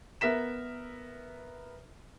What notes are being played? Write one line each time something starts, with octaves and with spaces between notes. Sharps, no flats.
B3 A#4 E5 B6 E7